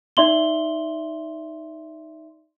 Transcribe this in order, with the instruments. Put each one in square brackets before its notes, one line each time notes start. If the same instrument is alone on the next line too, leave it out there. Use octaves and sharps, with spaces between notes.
[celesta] D#4 D5 E5 C6 F#7 G7